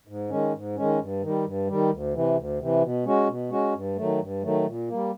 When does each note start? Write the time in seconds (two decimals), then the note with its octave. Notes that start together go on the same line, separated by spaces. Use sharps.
0.07 G#2
0.30 D#3 G#3 C#4
0.53 G#2
0.76 D#3 G#3 C#4
0.99 G2
1.22 D#3 G3
1.45 G2
1.67 D#3 G3
1.90 D2
2.14 C3 E3
2.36 D2
2.59 C3 E3
2.81 B2
3.05 G#3 C#4 F#4
3.27 B2
3.50 G#3 C#4 F#4
3.74 G2
3.96 D#3 F#3 A3
4.20 G2
4.43 D#3 F#3 A3
4.66 A#2
4.88 G3 A#3